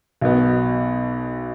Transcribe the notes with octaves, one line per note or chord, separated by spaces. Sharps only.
B1 B2 B3